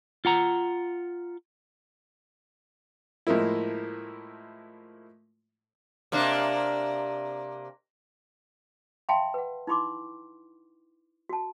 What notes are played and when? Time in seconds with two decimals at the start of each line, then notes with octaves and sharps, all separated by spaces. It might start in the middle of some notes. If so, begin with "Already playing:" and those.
0.25 F4 F#5 A#5
3.27 A2 F3 G#3 A#3 E4
6.12 C3 A#3 D4
9.09 E5 F5 G5 A5 B5 C6
9.34 B4 F#5
9.67 D#4 E4 B5 C6 D6
11.29 F#4 A5